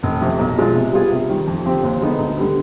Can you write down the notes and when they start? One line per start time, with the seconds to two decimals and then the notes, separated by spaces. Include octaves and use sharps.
0.03 F1
0.21 F2 C3
0.39 B1
0.57 B2 G#3 D4 F4
0.75 C3
0.93 G3 B3 F4 G#4
1.11 C3
1.29 D#3 G3
1.47 F2
1.65 D3 F3 C4 G4
1.83 D#2
2.01 D3 G#3 B3 D#4
2.19 D2
2.37 D3 G3 B3